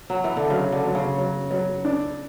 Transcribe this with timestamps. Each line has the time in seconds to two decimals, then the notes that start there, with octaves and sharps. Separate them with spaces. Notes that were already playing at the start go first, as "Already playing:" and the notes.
0.10 F#3
0.24 E3
0.37 D3
0.50 C#3 F#3
0.72 D3
0.84 F#3
0.95 C#3
1.18 F#3
1.51 F#3
1.85 D4